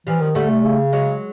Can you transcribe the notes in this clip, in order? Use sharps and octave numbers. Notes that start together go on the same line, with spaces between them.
E3 F3 G3
D#3
D3 G3 A3
C3
C#3
F#3 G#3